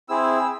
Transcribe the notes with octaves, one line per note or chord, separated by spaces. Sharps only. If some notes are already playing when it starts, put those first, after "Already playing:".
C4 E4 G#4 E6